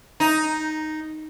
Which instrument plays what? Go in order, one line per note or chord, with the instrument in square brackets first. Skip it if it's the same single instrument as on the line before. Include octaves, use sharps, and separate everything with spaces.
[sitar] D#4